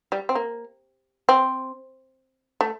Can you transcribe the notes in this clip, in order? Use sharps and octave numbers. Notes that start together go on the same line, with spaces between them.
G3
C4
A#3
C4
A3